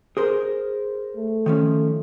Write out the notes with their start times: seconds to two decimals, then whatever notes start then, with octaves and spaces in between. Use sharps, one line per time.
0.17 G#4 A#4 C5
1.17 A3
1.46 D#3 F3 C#4